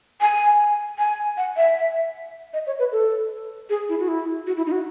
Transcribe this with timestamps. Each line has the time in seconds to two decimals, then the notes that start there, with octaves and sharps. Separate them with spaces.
0.21 G#5
0.98 G#5
1.37 F#5
1.57 E5
2.53 D#5
2.67 C#5
2.79 B4
2.92 A4
3.70 G#4
3.89 E4
3.99 F#4
4.08 E4
4.47 F#4
4.57 E4
4.66 D#4
4.72 F#4